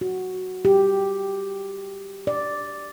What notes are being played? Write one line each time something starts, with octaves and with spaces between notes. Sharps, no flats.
F#4
G4
D5